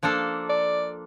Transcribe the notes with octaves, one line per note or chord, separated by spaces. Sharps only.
F3 A#3 D4 A4
D5